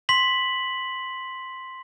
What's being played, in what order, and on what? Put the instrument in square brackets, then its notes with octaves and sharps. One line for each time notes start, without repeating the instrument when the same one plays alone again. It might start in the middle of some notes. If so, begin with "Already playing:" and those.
[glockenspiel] C6 B6 F#7